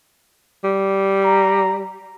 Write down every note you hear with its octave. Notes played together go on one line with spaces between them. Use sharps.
G3
A#5